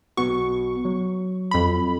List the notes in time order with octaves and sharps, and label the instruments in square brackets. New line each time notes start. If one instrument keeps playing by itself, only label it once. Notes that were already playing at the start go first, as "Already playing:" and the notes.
[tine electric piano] B1 B3 F#4 [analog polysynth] C#6
[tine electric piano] F#3
[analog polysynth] F2 B5